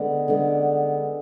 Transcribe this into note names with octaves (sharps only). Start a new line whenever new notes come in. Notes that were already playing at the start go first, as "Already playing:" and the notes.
Already playing: D3 G#3 B3
D3 G#3 B3